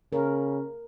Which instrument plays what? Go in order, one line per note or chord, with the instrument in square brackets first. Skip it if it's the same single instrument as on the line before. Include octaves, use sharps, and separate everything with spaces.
[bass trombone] C#3 [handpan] A#4